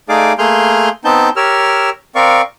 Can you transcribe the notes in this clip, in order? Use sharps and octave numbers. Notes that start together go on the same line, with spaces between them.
A3 D#4 G#4 D5 F5 D6
A3 A#3 G#4 C6 F6 G6
B3 C4 D#4 A5 G6
G4 A#4 C#5 E6 F6
C4 A#4 D5 F5 C#6